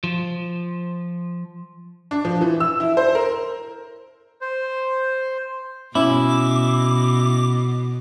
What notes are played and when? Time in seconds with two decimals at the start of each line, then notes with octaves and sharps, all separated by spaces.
0.04 F3
2.11 D4
2.25 F3
2.41 E3
2.60 E6
2.80 E4
2.97 C5
3.15 A#4
4.41 C5
5.95 B2 C#4 E4 D6